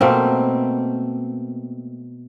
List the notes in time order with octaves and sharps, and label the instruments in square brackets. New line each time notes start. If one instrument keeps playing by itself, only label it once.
[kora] B2 A3 A#3 C4